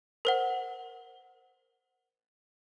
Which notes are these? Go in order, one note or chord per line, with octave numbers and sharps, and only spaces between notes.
A#4 C5 F#5